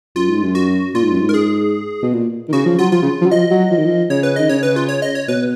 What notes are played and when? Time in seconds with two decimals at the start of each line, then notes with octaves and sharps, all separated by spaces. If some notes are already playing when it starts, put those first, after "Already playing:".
0.16 F#2 F4
0.29 G#2
0.42 F#2
0.55 F#4
0.94 A#2 F4
1.03 G#2
1.11 F#2
1.20 G#2
1.29 A#4
1.34 G#4
2.02 B2
2.13 A#2
2.48 D#3
2.53 C#3 F#4
2.66 F3
2.79 F#3 F4
2.92 F3 F4
3.02 C#3
3.21 F3
3.26 F#3
3.31 F3 D#5
3.51 F#3
3.71 F3
3.77 D#3
3.85 F3
4.10 C#3 C#5
4.23 B4
4.36 D#3 D#5
4.49 C#3 C#5
4.63 B4
4.76 F4
4.89 C#5
5.02 D#5
5.15 C#5
5.28 B2 B4